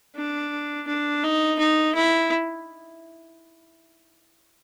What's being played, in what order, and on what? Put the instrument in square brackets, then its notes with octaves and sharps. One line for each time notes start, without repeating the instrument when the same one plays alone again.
[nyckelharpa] D4
D4
D#4
D#4
E4